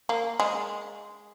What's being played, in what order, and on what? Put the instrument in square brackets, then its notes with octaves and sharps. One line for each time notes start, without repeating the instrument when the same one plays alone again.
[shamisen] A#3
G#3